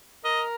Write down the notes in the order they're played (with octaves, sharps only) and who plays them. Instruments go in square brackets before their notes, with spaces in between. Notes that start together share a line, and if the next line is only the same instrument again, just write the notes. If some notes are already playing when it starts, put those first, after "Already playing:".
[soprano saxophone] A#4 [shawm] D#5